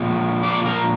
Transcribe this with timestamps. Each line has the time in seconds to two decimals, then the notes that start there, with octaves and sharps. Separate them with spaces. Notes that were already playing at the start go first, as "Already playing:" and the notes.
Already playing: A#2 F3 G#3
0.43 D5
0.66 A#4